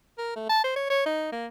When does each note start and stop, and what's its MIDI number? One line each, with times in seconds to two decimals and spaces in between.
0.18 0.34 70
0.36 0.48 57
0.49 0.64 81
0.64 0.76 72
0.76 0.88 73
0.90 1.05 73
1.06 1.29 63
1.32 1.47 58